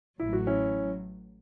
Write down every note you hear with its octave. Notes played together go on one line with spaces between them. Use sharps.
A1 A2 F#3 E4
F#4
C#4 E4